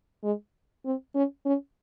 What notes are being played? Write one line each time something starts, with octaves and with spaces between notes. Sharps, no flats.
G#3
C4
C#4
C#4